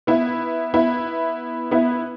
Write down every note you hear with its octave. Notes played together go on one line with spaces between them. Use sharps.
B3 E4
B3 E4
B3 E4